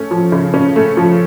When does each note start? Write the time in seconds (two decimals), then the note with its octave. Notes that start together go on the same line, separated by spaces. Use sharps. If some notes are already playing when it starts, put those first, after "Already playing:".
Already playing: A3 C#4
0.11 F3
0.32 C#3
0.54 C#4
0.76 A3
0.97 F3